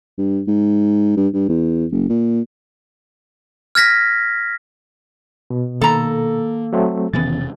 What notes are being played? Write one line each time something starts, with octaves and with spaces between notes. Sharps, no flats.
G2
G#2
G2
G2
E2
F#1
A#2
F6 G#6 A#6 B6
B2
D#3 A#3 A4 A#5
F#3 A3 C4
E1 C3 D#3 E3 B3 C#4 A6